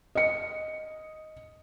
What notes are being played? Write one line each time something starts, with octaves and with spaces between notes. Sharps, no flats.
D#5 C#7